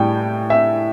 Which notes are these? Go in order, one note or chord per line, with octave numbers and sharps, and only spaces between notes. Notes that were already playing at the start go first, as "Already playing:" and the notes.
Already playing: A2 G3 G5
E5